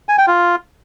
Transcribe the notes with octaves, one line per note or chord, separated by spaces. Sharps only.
G#5
G5
F4